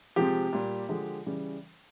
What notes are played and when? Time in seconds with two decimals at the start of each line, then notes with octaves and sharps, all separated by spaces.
0.16 C3 F3 G#3 G4
0.53 A#2 G3
0.89 D3 F3 G#3
1.26 C#3 E3 G3